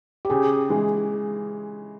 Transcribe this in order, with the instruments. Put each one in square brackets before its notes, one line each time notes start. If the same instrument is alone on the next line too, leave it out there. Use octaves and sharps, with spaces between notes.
[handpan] G4
[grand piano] C#3 [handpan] G#4
[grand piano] E3 G#3